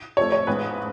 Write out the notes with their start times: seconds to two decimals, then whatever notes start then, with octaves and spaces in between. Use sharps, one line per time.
0.17 F2 F3 A3 C#5
0.32 C#5
0.47 A1 G#2 G#3 B3 B4